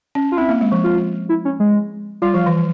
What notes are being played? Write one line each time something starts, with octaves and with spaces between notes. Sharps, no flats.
C#4
F4
C4 E4
A#3
G#3
F3
F4
E4
C#4
G#3
G3 F4
F3
E3